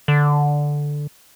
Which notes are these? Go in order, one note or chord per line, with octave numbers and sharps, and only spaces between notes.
D3